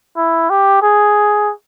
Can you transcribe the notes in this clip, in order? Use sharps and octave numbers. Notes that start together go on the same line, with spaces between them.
E4
G4
G#4